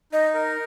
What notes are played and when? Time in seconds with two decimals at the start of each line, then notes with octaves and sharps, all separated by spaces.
0.12 D#4 D#5
0.34 A#4